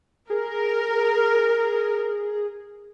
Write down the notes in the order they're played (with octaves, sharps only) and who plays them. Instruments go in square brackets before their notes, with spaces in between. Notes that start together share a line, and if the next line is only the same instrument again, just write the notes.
[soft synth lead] G#4 [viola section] A#4